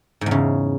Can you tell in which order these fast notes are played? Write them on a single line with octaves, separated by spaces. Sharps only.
G#2 E2 C#3